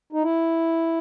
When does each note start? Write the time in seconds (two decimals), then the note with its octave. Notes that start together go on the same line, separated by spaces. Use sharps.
0.13 D#4
0.23 E4